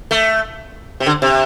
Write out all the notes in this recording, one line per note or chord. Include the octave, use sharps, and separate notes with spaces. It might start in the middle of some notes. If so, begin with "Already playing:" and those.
A3
C3
D3
C3